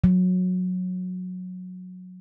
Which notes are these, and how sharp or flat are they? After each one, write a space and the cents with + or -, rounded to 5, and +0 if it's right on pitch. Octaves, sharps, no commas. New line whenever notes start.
F#3 -20